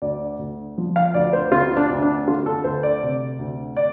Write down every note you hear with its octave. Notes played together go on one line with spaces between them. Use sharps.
D2 D5
D2
F3
F5
D2 D5
C5
D2 F4
D4
D2
D4
D3 F4
A4
D2 C5
D5
C3
D2
D5